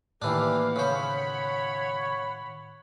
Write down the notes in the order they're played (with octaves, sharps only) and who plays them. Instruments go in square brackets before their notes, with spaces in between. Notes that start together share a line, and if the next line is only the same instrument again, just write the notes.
[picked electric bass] A2 D#3 [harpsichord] E3 D4 [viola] A#3 F5 [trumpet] G4
[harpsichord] C#3 C5 [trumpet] C#5 [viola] F#5 B5